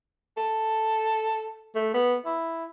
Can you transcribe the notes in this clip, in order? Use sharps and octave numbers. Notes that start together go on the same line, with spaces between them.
A4
A3
B3
E4